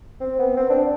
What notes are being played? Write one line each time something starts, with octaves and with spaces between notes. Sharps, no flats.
C4
B3
C4
D4